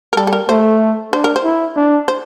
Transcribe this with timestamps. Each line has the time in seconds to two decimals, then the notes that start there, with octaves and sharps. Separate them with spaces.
0.13 A#4
0.17 G3 A4
0.27 A4
0.33 A#4
0.49 A3 C5
1.13 D4 C5
1.24 A#4
1.36 C5
1.44 E4
1.76 D4
2.08 C5